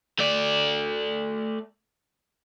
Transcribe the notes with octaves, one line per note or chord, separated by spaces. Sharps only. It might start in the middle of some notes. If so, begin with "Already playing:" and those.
A3 D5